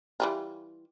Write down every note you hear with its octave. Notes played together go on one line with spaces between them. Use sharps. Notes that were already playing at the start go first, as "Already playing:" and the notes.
E3 G3 F4